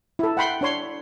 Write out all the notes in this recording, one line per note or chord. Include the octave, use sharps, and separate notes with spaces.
E4 A4
F#5 G5 B5 C6
D4 C#5 C6